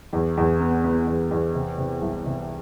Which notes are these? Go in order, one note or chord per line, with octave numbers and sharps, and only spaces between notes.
E2
E2
B3
B3
E2
E2
C3
C3
C2
C3